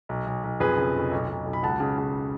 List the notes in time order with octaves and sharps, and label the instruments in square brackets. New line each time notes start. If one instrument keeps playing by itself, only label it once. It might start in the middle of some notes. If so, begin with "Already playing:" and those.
[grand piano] B1
B1
B1
F2 G#4 B4
C#3
F1
B1
B1
B1
B5
C#2 F#5 A5
C#3
C#3